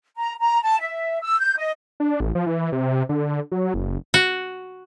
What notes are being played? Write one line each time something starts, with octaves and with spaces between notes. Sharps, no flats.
A#5
A#5
A5
E5
E6
G6
D#5
D4
A1
F3
E3
C3
D3
F#3
F#1
F#4